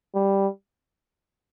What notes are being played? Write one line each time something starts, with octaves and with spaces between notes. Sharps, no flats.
G3